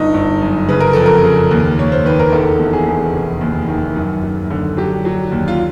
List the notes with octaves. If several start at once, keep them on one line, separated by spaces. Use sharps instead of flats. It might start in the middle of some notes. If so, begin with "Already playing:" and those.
Already playing: G1 D#4
G1
F#2
C#3 B4
A#4
F2 A4
A#4
C#3
D#2
A#3 C#5
C5
D#3 B4
A#4
E1 A4
E2
G#4
E2
F1
D#2
D#3
F#2
F#2
D3
F#3 G4
F#3
D#2
F4